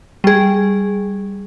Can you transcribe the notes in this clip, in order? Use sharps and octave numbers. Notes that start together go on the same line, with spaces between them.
G3 G#4